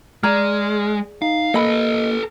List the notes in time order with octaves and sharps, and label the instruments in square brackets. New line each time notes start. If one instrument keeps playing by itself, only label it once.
[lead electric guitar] G#3 [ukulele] G#4 D5 A#5 [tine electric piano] F6
[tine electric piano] D#4 [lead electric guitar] F5
[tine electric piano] A#3 [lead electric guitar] A4 B4 [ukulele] D#5 B5